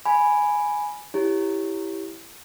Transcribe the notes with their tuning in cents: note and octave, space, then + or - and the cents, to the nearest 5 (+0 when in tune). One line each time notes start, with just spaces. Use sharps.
G#5 +0 B5 -5
E4 +0 G4 +0 C#5 -5